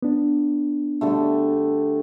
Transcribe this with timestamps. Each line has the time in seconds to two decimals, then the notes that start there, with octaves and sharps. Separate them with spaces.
0.03 B3 D4
1.01 D3 G3 A3